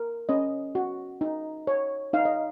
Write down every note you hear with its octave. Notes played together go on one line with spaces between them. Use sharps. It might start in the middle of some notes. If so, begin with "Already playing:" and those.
Already playing: A#4
C#4 D#5
F#4
D#4
C#5
D#4 F5
D#5